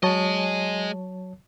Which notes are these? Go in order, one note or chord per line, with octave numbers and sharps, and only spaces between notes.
F#3 G#3 C#5 D#5 A5